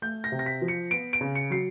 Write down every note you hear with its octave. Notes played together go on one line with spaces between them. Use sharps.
A3 G6
A#6
C3
A#6
B6
F3
C#7
B3 D7
D7
C#3
C#7
F#3 C7